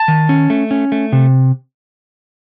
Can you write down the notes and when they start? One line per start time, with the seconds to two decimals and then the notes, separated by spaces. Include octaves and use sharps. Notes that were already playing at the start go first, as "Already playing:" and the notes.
Already playing: A5
0.08 D#3
0.29 C#4
0.50 A3
0.71 C#4
0.92 A3
1.13 C3